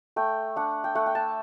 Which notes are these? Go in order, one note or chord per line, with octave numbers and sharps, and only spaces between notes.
A3 G5
D4 F#5
G5
A3 F#5
G5
A5